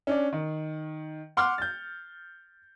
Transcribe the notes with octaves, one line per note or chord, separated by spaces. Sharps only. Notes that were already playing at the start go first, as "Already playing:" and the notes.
C#4 D4 D5
D#3
F#5 C6 D6 F6
G6 A6